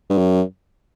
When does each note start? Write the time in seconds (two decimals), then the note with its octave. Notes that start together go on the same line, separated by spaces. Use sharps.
0.10 G2
0.18 F#2